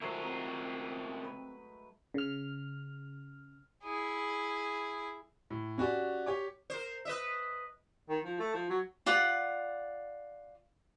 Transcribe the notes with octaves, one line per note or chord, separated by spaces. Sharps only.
C#2 F#3 G#3 A3 F4 A#4 C5 E5
C4 D#4
B4
C#3 F6
E4 G#4
A2
C#4 F#4 G4 D5
G4 C#5 D6
A#4 C5
B4 D#5 E5
D#3
F3
A3
F3
F#3
F4 D5 F#5